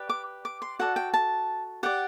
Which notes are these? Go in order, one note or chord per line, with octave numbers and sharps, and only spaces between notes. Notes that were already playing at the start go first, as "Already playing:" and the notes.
Already playing: G4 B4 D5
D6
D6
C6
F#4 A4 D5 F#5
G5
A5
G4 D5 F#5